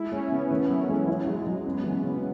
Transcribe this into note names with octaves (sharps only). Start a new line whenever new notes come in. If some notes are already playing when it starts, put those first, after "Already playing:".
Already playing: G#3 E4
G#3 C#4
C#3 B3
D#3 A3
F#3 B3
E3 G#3
F#3 E4
F#3 G#3
F#3 G#3
F#2 B3
E3 B3
C#4
C#3 B3